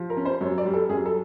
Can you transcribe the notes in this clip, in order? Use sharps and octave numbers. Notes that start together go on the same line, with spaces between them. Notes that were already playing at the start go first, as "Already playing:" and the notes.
Already playing: F3
A#4
C#4
C5
F#2 C#5
D5
G3
A4
F#2 G#4
A4